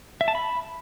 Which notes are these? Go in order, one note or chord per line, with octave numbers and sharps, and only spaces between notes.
E5
A5
B5